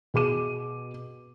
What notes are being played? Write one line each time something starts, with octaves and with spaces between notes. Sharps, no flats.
B2 G#4 D6 D#7